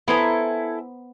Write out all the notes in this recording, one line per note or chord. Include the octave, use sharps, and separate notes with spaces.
B3 E4 A4 C5 G#5 A#5